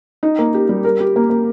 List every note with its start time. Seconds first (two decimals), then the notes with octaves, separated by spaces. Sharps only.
0.23 D#4
0.39 A#3
0.55 G4
0.69 G3
0.85 A#4
1.00 G4
1.16 A#3
1.30 A#3